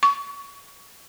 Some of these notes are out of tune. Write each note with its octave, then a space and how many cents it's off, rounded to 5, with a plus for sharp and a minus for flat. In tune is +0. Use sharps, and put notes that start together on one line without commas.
C#6 +25